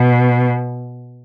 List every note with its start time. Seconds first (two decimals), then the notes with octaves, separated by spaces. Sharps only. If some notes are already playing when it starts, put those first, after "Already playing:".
Already playing: B2